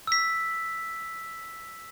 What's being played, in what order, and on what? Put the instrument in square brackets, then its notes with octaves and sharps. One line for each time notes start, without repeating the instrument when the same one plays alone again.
[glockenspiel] E6 B6